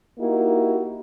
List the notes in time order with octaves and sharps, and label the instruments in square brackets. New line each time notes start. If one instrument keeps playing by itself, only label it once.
[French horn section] A#3 D#4 E4 F#4 G4